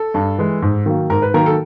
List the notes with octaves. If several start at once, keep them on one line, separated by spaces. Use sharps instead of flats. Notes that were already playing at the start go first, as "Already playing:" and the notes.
Already playing: A4
G2
E3 G#3
G#2
D#3 F#3 A#3
G#2 A#4
B4
D#3 F#3 A#3 A#4
A4